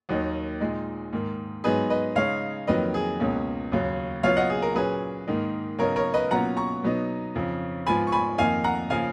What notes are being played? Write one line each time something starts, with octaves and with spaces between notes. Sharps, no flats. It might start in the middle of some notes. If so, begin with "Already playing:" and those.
D#2 D#3 F#3 A#3 D#4
A#2 G#3 D#4
G#2 D#3 A#3
G#2 F#3 B3 D#4 G#4 B4
B4 D#5
C#3 G#3 D#4 C#5 F5
F2 D#3 F#3 A#3 B4 D#5
G#4
C#2 B2 A#3 C#4
D#2 C#3 F#3
C#3 F#3 B3 F4 C#5 F5
D#5 F#5
G#4
A#4
A#2 F#3 C#4 G#4 B4
G#2 D#3 A#3 D#4
C#3 F#3 B3 D#4 A#4 C#5
A#4 C#5
B4 D#5
B2 F#3 A#3 C#4 F4 F#5 A#5
A#5 C#6
B2 F#3 B3 D#4
F2 C#3 F3
G#2 F3 B3 F4 G#5 B5
C#6
G#5 B5
F2 D#3 A#3 D#4 F5 G#5
F#5 A#5
C#3 F3 A#3 F5 G#5